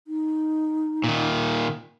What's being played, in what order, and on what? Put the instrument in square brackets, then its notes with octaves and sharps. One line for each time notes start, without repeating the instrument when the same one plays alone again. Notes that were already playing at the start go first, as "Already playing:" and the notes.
[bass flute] D#4
[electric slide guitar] A#2 D#3